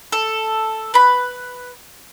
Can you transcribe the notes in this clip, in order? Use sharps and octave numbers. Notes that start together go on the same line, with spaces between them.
A4
B4 B5